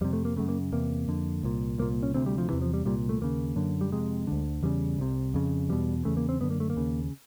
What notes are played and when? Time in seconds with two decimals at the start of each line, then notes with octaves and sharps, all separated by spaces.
0.01 F2 C3 G3
0.13 A3
0.25 A#3
0.36 F#2 C#3 A3
0.48 A#3
0.72 E2 C3 A#3
1.08 F2 D3
1.43 C2 A#2
1.78 C2 A#2 A#3
2.03 C#4
2.14 D2 C3 C4
2.26 G3
2.38 F3
2.49 E2 C3 E3
2.62 F3
2.74 G3
2.85 C2 A#2 G3
3.09 A3
3.21 D#2 C#3 A#3
3.56 F#2 D3
3.81 G3
3.92 F2 C3 G#3
4.27 D2 D3
4.63 E2 C#3 G3
4.99 C2 C3
5.34 F2 C#3
5.69 E2 B2 G3
6.05 E2 C#3 A3
6.17 A#3
6.29 C4
6.40 F#2 D3 B3
6.50 A#3
6.60 A3
6.70 A#3
6.76 D#2 C#3